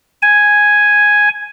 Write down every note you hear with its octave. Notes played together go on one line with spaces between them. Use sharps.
G#5